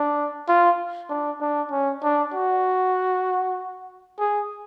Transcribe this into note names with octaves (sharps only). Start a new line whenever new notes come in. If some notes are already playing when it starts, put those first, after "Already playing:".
Already playing: D4
F4
D4
D4
C#4
D4
F#4
G#4